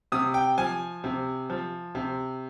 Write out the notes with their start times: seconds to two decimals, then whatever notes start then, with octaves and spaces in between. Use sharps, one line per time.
0.12 C3 D#6
0.34 G5
0.58 F3 G#5
1.04 C3
1.50 F3
1.95 C3